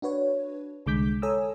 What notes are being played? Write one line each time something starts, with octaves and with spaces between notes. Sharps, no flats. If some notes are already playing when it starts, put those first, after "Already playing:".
D4 F#4 B4 C#5
C2 D3 G#3 D6 G6 B6
A4 C#5 G#5 A#5 D#6 E6